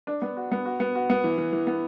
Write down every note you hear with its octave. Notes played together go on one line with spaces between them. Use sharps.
D4
B3
F#4
B3
F#4
B3
F#4
B3
E3
E3
E3
B3